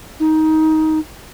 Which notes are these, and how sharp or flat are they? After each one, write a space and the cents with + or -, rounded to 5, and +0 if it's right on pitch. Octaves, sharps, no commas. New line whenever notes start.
D#4 +15